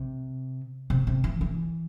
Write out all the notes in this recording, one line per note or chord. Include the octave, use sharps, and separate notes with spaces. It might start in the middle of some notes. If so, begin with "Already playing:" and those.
Already playing: C3
C3
C3
E3
E3